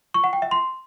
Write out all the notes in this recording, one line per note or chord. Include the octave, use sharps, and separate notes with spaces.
C#6
F#5
G5
E5
C6